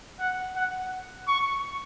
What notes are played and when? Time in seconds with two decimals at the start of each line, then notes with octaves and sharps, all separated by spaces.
0.20 F#5
0.56 F#5
1.28 C#6